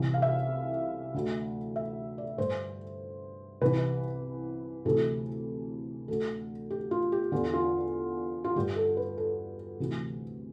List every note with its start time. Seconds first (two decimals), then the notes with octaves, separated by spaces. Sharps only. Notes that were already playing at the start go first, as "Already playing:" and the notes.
Already playing: C2 C3 E3
0.14 F5
0.22 E5
1.14 D2 D3
1.76 E5
2.18 D5
2.38 G2 D3 C5
3.61 C2 C3 E3 B4
4.85 D2 C3 E3 A4
6.08 D2 D3 A4
6.70 G4
6.91 F4
7.12 G4
7.32 E2 D3 F4
7.54 F4
8.44 F4
8.56 G2 D3 G4
8.76 A4
8.97 B4
9.18 A4
9.80 D2 C3 E3